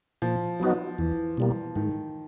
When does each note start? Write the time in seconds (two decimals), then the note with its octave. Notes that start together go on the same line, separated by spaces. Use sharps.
0.22 A#2 F3
0.60 F#3 B3 D#4 F#4
0.98 E2 E3
1.38 B2 G3 A#3
1.76 G#2 D#3